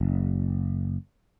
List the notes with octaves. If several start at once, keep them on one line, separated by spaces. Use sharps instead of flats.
F#1